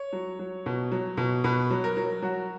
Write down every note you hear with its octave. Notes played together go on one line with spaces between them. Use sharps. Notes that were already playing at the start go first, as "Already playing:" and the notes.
Already playing: C#5
F#3
F#3
B2
F#3
B2
B2 B4
F#3
A#4
F#3
F#3 F#4